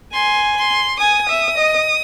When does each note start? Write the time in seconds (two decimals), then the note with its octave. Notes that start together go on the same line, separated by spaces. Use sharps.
0.13 G#5 C6
0.57 C6
1.00 G#5 D#6
1.28 E5
1.57 D#5